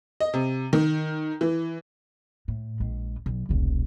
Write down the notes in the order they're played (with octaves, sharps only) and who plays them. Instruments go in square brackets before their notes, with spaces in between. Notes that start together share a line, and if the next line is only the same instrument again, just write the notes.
[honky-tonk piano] D#5
C3
D#3
E3
[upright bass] A2
A#1 G#3
B1
E1 C2